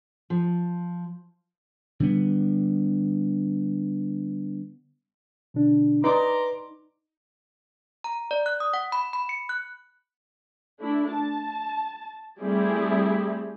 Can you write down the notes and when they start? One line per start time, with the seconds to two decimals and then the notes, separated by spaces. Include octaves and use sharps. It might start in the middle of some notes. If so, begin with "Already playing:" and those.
0.30 F3
2.00 D3 G3 B3
5.54 B2 D3 D4
6.04 D#4 B4 D5 A#5 C6 D6
8.04 A#5
8.31 D5
8.46 F#6
8.60 D#6
8.73 F#5
8.92 B5
9.13 B5
9.29 C#7
9.49 F#6
10.79 A3 D4 E4
11.11 A5
12.40 G3 A3 C4 E4 G4 G#4